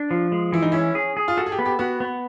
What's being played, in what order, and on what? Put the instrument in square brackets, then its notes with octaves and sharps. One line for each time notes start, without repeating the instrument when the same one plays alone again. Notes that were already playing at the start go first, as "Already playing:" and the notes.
Already playing: [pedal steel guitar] D4
F3
G#3
[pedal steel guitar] E3 [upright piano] E4
[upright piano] D#4
[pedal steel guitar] C#4 [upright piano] E4
[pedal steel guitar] G#4
G#4
[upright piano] F4
[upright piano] F#4 [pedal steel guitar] A4
[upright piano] G#4
G4
[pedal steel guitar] B3
[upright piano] G4
[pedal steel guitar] B3 [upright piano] F#4
[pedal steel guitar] B3